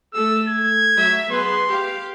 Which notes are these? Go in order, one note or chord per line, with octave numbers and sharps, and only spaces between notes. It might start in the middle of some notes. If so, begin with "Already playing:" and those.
A3 A4 E6
G#6
F#3 A3 E5
B3 G#4 B4 C6
G4 F5